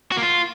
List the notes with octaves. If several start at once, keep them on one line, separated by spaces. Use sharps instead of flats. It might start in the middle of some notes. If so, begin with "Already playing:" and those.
F#4
A#3
F4